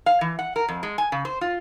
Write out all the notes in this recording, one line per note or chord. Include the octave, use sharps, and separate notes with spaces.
F5
E3
F#5
A#4
F2
G#3
G#5
C#3
C5
F4